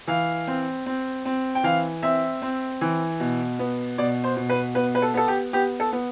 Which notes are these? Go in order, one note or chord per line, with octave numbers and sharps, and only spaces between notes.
E3 F5
C4
C4
C4
G5
E3 F5
C4 E5
C4
E3
B2
B3
B2 D5
C5
B2
B4
B3 B4
B4
A4
B3 A4
G4
B3 G4
A4
B3